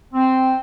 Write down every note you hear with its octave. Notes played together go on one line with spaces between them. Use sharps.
C4